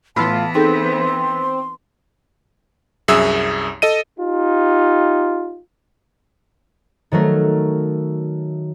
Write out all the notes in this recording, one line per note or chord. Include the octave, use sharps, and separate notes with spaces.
A2 E3 B3 F4 A5 B5 E6 F6
C4 D#4 G#4 A4 C6
C2 F#2 G#4 E5 D#6 E6
A4 D#5 D#7
D#4 F4 G4
D#3 F#3 A3 A#4